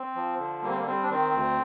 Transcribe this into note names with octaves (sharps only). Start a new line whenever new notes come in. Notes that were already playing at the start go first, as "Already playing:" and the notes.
Already playing: C4
F3
D3
G3 A#3
C4
A#3
G3 C4
D4
D#3 C4
D2